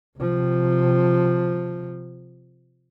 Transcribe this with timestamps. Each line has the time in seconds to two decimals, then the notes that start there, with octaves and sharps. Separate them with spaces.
0.18 C3 F3